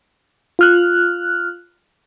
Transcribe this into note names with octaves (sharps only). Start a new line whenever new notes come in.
F4 F6 F#6